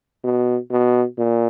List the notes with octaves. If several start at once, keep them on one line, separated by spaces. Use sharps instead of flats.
B2
B2
A#2